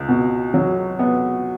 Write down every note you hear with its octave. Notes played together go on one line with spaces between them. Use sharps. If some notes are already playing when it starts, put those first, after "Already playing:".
Already playing: C#2
B2
F#3
B3